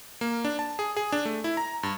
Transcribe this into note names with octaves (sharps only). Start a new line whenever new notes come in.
A#3
D4
A5
G#4
G#4
D4
A3
E4
A#5
G2